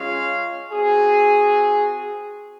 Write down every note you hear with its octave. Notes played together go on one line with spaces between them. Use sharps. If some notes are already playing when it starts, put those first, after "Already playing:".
Already playing: G#3 C#4 F4 C#5 F5
C4 F#4 G#4